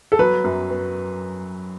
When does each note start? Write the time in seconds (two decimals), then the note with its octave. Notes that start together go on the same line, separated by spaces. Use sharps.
0.12 A4
0.19 F#3 B4
0.44 F#2
0.70 B3